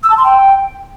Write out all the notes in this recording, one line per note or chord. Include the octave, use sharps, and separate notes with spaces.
E6
A5
C6
G5